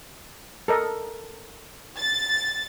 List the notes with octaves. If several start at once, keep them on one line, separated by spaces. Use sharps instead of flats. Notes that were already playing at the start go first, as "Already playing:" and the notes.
A4 A#4 D#5
A6